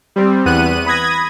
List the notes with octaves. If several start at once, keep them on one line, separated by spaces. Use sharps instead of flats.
G3 C4
E2 B3 F#6 D#7
B5 D#6 G#6 A#6